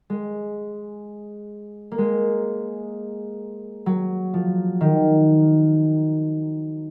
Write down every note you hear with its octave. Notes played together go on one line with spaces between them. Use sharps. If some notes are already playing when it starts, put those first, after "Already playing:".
G#3
A#3
G#3
F#3
F3
D#3